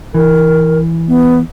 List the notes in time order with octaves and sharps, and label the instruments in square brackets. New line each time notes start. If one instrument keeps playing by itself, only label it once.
[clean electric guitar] E3 [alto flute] A#4
[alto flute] B3